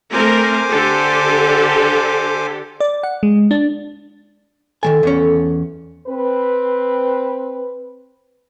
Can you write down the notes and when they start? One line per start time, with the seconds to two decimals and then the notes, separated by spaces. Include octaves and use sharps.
0.13 A3 C4 A#4 C5 G#5 D6
0.69 D3 G4 A4
2.80 D5
3.03 F#5
3.23 G#3
3.51 D4
4.83 D#3 F#3 A4 G#5
5.03 E2 C#4
6.08 C4 B4